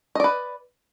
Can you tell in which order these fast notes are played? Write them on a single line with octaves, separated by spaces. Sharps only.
D#5 D5 B4